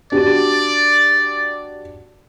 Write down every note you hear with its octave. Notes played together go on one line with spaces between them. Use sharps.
D4 F#4 G4 D5